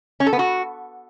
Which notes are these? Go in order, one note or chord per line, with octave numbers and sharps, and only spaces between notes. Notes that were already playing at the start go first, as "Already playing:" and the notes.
C#4
A4
B3
F#4